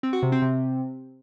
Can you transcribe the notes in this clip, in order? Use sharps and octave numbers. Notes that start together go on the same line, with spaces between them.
C4
F#4
C3
C4
C3